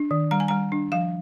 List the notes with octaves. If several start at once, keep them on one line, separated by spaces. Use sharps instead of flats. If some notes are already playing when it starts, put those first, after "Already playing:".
Already playing: D4
D#3
G3 A#5
G#5
G3 A#5
D4
F3 F5